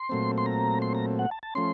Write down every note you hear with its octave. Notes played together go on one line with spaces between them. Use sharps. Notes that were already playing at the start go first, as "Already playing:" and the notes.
Already playing: C6
A#2 F#3 A3 C4
C6
A#5
C6
A#5
F#5
A5
A5
F3 A3 C#4 C6